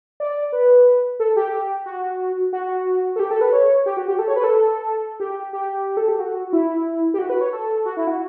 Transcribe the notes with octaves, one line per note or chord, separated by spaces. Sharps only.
D5
B4
A4
G4
G4
F#4
F#4
A4
G4
A4
B4
C#5
G4
F#4
G4
A4
C#5
B4
A4
G4
G4
A4
G4
F#4
E4
G4
F#4
B4
C#5
A4
F#4
E4
F#4